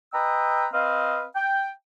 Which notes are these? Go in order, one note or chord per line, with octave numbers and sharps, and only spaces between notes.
B4 D#5 G5 A#5 E6
C4 B4 D#5 F5
G5